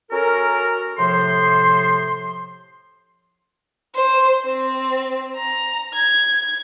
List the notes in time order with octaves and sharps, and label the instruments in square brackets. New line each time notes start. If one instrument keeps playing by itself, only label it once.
[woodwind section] C#4 F#4 A4 A#4
A2 C3 F3 C5 C6
[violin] C5
C4
A#5
G#6